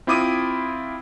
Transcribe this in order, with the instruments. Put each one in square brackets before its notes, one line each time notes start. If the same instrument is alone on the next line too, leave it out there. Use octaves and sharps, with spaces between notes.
[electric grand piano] C4 E4 F4 D6 D#6 D#7